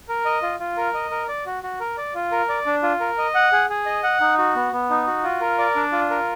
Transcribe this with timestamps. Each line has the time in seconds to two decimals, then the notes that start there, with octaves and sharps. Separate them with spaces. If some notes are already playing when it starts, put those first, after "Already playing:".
0.09 A#4
0.25 D#5
0.43 F4
0.60 F4
0.77 A#4
0.94 D#5
1.11 A#4
1.28 D5
1.46 F#4
1.63 F#4
1.80 A#4
1.98 D5
2.15 F4
2.32 A#4
2.49 D5
2.66 D4
2.83 F4
3.00 A#4
3.18 D#5
3.35 F#5
3.52 G#4
3.70 G#4
3.86 D#5
4.03 F#5
4.20 D#4
4.38 F#4
4.55 B3
4.73 B3
4.90 D#4
5.07 F#4
5.24 F4
5.41 A#4
5.58 D5
5.76 D4
5.92 F4
6.10 A#4